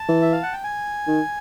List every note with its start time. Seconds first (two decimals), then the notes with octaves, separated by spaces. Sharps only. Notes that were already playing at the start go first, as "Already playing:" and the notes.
Already playing: A5
0.09 E3
0.22 E5
0.32 F5
0.43 F#5
0.53 G5
0.64 G#5
1.07 D#3